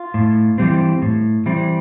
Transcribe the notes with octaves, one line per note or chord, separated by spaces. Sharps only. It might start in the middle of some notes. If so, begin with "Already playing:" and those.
Already playing: F4
A2
E3 G3 C4
A2
E3 G3 C4